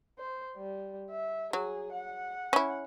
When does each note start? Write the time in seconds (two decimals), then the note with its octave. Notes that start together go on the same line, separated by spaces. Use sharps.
0.19 C5
0.56 G3
1.10 E5
1.53 F#3 G#4
1.92 F#5
2.53 C#4 E4